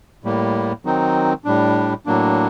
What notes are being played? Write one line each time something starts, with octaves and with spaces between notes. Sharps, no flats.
A2 G3 A#3
D#3 F#3 C4 D#4
A2 G3 D4
A2 F#3 A#3 D4